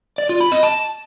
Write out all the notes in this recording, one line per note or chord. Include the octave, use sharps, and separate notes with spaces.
D5
F4
B5
D#5
A5